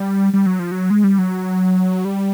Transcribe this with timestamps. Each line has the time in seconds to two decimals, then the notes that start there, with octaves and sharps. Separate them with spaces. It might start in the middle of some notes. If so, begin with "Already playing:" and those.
Already playing: G3
0.33 G3
0.46 F#3
0.59 F3
0.72 F#3
0.90 G#3
1.04 G3
1.19 F#3
2.05 G3